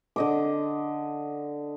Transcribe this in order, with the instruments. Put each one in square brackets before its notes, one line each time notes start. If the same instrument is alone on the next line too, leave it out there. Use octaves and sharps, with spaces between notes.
[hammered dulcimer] D3 D#5 D6